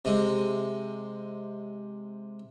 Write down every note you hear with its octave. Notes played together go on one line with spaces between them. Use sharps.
C3 G#3